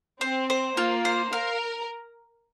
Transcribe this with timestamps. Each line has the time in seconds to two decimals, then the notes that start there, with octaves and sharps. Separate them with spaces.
0.21 C4 C5
0.50 C5
0.77 A#3 F4
1.05 C5
1.33 A#4 F5